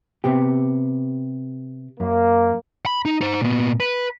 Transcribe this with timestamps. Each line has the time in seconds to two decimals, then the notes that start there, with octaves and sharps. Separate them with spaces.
0.24 C3 B3 G4
2.00 F#2 A#3
2.86 B5
3.05 D#4
3.21 D#4 C5
3.42 A#2 B3
3.80 B4